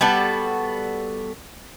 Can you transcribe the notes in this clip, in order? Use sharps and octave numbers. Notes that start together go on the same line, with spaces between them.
G3 B3 F#4 A4